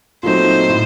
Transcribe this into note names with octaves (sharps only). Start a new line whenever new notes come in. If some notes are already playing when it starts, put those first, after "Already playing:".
A#2 F#3 A3 C4 D#4 C5
A2